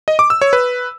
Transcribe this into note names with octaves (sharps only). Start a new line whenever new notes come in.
D#5
D6
E6
C#5
B4